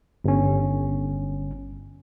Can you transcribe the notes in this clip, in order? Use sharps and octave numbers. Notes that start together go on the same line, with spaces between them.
G1 C#4